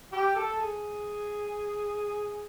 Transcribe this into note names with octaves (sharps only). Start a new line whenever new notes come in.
G4
A4
G#4